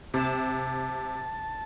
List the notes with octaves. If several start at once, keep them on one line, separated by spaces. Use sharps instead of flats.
C3 A5